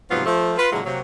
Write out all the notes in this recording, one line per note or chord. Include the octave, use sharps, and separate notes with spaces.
G#2 C3 F3 F#3 B3 F4
F3 A3
F4 B4
A#2 D3 E3 F#3 G#3 A#3
C3 F#3 A#3